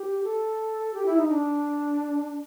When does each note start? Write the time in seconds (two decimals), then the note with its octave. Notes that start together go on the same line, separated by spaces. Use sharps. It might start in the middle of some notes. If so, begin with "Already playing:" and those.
Already playing: G4
0.24 A4
0.94 G4
1.06 E4
1.17 D#4
1.28 D4